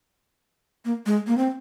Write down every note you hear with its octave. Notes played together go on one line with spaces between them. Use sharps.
A#3
G#3
A#3
C4